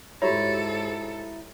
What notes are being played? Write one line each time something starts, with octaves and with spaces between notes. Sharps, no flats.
G#2 E4 F#4 G4 A4 C#5 A#5